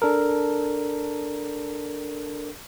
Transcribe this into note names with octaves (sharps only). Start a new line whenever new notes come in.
D4 A4 A#4